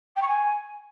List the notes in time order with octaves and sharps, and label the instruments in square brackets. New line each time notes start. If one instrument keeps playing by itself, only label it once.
[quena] G5
C#6
G#5